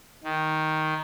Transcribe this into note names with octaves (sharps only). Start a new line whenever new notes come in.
D#3